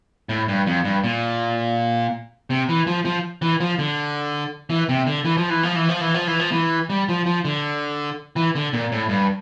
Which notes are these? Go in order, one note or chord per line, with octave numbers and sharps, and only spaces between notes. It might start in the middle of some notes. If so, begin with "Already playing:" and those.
A2
G2
F2
G2
A#2
C3
E3
F3
F3
E3
F3
D3
E3
C3
D3
E3
F3
E3
F3
E3
F3
E3
F3
E3
F3
E3
G3
F3
F3
D3
E3
D3
A#2
A2
G2